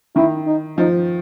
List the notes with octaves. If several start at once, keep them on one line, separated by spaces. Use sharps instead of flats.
D#3 E4
D#4
F3 D#4